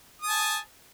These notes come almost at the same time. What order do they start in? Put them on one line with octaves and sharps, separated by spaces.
D#6 A5 G#5